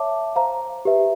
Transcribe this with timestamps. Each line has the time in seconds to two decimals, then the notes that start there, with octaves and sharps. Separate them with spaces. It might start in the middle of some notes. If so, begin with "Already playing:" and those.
Already playing: C#5 E5 A5 D6
0.36 C5 F5 A#5
0.85 G4 B4 E5